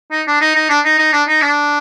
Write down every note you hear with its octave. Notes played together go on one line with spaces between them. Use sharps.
D#4
D4
D#4
D#4
D4
D#4
D#4
D4
D#4
D4